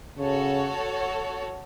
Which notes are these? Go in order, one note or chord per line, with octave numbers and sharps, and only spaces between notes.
C#3 F#4 A4 C#5